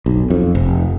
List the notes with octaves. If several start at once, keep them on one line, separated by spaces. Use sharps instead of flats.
B1
F2
F1